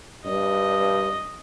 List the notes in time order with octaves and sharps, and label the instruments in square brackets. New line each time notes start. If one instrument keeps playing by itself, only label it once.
[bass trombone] G2 [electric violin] D#5